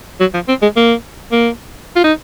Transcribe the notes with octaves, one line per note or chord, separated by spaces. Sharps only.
F#3
F3
C4
G#3
A#3
A#3
F4
D#4